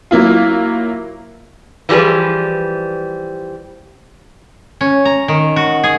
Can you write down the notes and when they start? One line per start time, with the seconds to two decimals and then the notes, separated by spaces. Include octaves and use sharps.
0.11 F#3 A#3 E4 F4
1.89 E3 F3 G3 G#4 B4
4.81 C#4
5.05 A#5
5.28 D#3
5.56 F#4
5.84 G#4